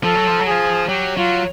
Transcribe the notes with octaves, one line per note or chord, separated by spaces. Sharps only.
F3 A4
F#3
F3
F#3
F3 G#4
F#3 G4
F#3 F4